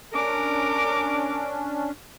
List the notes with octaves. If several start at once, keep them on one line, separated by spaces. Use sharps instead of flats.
C#4 D4 A#4 D6